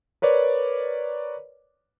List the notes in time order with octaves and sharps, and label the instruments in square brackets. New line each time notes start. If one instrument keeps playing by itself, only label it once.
[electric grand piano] A#4 B4 C#5 D5